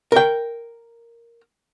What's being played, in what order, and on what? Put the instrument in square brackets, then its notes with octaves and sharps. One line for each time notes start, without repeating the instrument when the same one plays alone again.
[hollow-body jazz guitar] A#4 G5